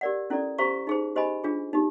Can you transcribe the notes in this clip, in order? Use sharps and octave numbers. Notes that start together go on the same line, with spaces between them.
G4 A#4 D5 F#5
C#4 E4 A4 D5
G4 C5 F5 A#5 C#6
D#4 G#4 C5
G4 C5 D#5 G#5 B5
D4 F4 G#4
D#4 G4